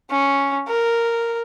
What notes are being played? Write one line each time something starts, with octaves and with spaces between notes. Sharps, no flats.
C#4
A#4